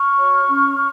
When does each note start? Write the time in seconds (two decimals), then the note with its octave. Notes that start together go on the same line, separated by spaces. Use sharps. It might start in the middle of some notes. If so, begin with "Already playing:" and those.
Already playing: C#6 F6
0.16 F#4 C#5
0.48 C#4